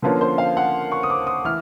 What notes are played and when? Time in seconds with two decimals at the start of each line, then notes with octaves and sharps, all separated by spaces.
0.02 D3 F3 A#3 C#4 F4 B4
0.21 C5
0.38 F5
0.57 F#5
0.92 C#6
1.03 D#6
1.10 D6
1.27 D#6
1.45 E3 F6